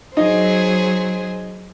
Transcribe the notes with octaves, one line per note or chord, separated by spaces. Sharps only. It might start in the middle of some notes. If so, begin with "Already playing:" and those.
F#3 D#4 G#4 C5 D#5